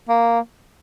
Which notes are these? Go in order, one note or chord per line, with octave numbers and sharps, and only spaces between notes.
A#3